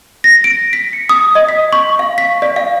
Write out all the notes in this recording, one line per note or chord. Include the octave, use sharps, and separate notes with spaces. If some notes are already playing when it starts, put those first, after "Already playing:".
A#6
D7
B6
C#7
D#6
D#5
B6
C#6
F5
B6
D5
F5